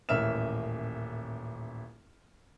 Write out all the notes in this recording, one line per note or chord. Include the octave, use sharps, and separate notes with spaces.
D#1 A1 A#3 E5 F6 E7